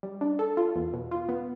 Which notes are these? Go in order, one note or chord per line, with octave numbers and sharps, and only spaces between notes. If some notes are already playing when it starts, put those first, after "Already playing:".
G3
D4
A4
F4
E2
B2
F4
B3